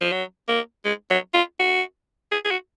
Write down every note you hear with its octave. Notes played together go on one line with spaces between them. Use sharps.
F3
F#3
A#3
G#3
F#3
F4
F#4
G#4
G#4
F#4